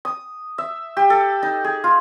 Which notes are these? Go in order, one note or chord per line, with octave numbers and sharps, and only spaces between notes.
D#6
E5
G4
A4
D#4
G#4
F4